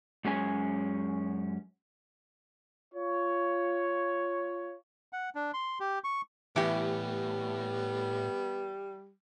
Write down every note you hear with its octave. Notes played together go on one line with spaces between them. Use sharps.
F#2 G#3 C#4 G#5
F4 C#5
F#5
D4
C6
G4
C#6
A2 E3 G3 B3 G4